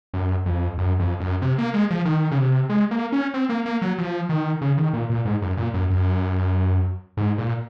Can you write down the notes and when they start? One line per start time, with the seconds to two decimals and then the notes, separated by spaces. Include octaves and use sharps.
0.14 F#2
0.46 F2
0.78 F#2
1.00 F2
1.20 F#2
1.42 C3
1.58 A#3
1.74 G#3
1.90 F3
2.05 D#3
2.31 C#3
2.38 C3
2.69 G#3
2.91 A#3
3.12 C#4
3.34 C4
3.49 A#3
3.66 A#3
3.82 F#3
3.98 F3
4.29 D#3
4.61 C#3
4.77 D#3
4.93 A#2
5.10 A#2
5.25 G#2
5.42 F#2
5.57 A#2
5.74 F#2
5.90 F#2
7.17 G#2
7.38 A#2